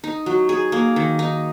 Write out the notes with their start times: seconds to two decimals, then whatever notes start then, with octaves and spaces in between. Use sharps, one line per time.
0.04 D#4
0.26 F#3
0.49 G#4
0.72 A#3
0.96 D#3
1.19 D#4